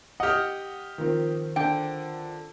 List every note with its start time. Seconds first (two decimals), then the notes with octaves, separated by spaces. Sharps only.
0.20 G4 D#5 F#5 F6
0.98 D#3 F3 C4
1.56 D3 G5